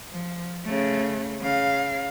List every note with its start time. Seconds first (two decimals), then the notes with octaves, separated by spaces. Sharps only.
0.11 F3
0.65 C#3 A3
1.41 C#3 F5